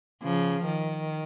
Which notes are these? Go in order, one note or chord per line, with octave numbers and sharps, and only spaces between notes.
C#3 F3
D#3